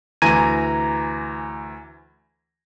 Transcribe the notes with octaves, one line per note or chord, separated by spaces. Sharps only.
D2 E3 G#5 A#5 G#6 D#7